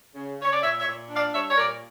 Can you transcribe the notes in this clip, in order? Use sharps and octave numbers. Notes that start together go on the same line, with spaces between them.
C#3
C#3 C#5
D5
A#2 C#5 E5
C#5 E5
A#2
D4
D5 F5
G3 C#5 E5
C#5
A#2 A#4 D5